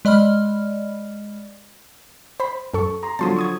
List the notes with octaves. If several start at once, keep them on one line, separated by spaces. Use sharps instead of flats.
G#3 D5 D#5 B5 F6
C5 B5
F#2 A4 C#6
A#5 C6
D3 F3 F#3 A5 C6 D#6
C#6 D#6 G#6